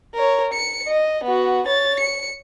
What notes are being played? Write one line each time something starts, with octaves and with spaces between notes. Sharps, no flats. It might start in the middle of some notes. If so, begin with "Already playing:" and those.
A#4 C#5
C#7
D#5
B3 F#4
C#5 A6
C#7